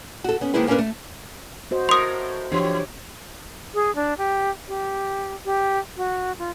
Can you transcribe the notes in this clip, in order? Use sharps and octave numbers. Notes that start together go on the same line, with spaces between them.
F#4 A4
B3 C#4
D#3 G#3 A#3 C4 E4 B4
A#3 C#4 D4 G#4 A#4 B4
A3
F#4 C5 D#5
A2 A#4 C6 D#6
E3 D4 G4 C#5
G#4
D4
G4
G4
G4
F#4
F4